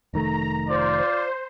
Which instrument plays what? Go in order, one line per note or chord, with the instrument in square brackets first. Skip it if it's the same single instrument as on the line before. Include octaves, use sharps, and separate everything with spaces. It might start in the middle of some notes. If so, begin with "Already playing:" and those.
[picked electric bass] F1 D#3 A3 [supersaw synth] A#5
[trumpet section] F4 D5 [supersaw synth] C5